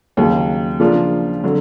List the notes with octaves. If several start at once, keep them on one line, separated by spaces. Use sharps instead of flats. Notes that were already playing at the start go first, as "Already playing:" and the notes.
D#2 C#3 F#3
C#3 F3 A#3 D4 F4
D3 F#3